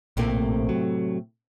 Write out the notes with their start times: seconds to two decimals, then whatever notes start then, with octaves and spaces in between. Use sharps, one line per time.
0.17 A#1 A2 C3 A3 A#3
0.69 F#3